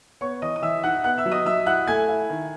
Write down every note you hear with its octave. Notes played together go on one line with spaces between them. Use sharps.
B3 C#5 C#6
E3 D#5 D#6
D#6
E3 E5 E6
D#4 F#5 F#6
B3 F#5 F#6
E5 E6
F#3
D#5 D#6
F#3 E5 E6
E4 F#5 F#6
A3 G#5 G#6
E4
D#3